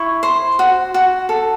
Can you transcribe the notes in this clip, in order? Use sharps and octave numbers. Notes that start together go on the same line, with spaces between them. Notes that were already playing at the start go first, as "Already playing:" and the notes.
Already playing: E4 C#6
C5
F#4
F#4
A4